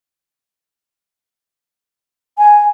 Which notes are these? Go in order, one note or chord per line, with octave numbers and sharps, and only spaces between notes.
G#5